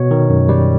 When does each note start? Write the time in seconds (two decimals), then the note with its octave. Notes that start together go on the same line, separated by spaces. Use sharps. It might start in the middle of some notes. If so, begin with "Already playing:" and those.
Already playing: B2 C#5
0.11 D#3
0.29 F#2
0.49 G3